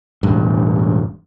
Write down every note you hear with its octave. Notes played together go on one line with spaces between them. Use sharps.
E1 A1 G2